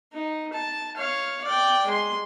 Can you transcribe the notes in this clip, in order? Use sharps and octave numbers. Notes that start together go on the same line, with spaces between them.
D#4
A5
C#5 F5
D5 G5
G#3 C6